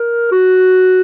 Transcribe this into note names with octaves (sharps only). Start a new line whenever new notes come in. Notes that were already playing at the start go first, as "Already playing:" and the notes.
Already playing: A#4
F#4